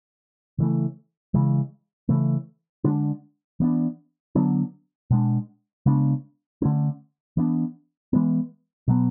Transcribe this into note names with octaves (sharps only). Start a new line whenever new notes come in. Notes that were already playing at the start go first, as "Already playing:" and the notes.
C#3 E3 A3
C#3 E3 G#3
C#3 E3 A3
D3 G#3 D4
E3 B3 D4
D3 F#3 B3 D4
B2 G#3 D4
C#3 G#3 B3 D4
D3 A3 C#4
E3 B3 D4
E3 G#3 B3
B2 F#3 B3